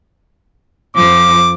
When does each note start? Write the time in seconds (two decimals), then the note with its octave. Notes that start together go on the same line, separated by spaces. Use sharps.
0.96 F2 F3 D6